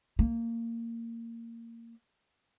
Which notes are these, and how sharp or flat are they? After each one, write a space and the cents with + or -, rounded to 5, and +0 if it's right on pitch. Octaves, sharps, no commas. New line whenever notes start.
A#3 -15